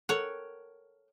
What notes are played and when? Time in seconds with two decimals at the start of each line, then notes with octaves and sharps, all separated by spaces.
0.09 A4 A#4 C#5 F#5 G5